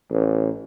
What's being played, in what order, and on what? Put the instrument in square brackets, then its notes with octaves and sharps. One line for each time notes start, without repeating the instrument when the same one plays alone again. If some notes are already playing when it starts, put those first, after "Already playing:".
[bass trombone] A1